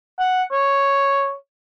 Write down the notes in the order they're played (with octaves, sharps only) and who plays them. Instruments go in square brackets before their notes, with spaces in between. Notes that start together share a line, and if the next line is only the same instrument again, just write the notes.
[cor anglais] F#5
C#5